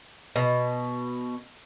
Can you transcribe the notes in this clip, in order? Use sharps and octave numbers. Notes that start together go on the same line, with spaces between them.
B2